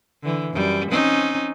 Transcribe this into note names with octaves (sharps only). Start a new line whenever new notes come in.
D3 E3
F#2 G3
C4 C#4 D#4